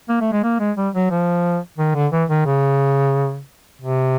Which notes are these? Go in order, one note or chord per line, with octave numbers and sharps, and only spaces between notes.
A#3
A3
G#3
A#3
G#3
G3
F#3
F3
D#3
D3
E3
D#3
C#3
C3